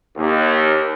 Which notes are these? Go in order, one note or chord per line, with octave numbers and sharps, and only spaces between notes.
D#2